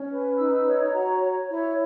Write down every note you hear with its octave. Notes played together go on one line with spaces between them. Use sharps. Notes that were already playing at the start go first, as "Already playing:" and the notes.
Already playing: C#4
B4
D#4 E6
C#5
F#4 A#5
C#5
E4 C#5